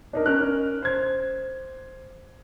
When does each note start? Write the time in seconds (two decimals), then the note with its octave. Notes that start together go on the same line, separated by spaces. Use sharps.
0.13 D4 D#4 A#4
0.26 C#4 A#4 F6 F#6
0.82 C5 G#6